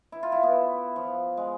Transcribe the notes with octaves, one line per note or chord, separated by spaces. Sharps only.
E4
F4
E4
B3
F3
G#3